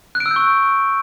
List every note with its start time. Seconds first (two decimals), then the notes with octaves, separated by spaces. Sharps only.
0.15 F#6
0.20 D7
0.26 E6
0.31 G6
0.36 C#6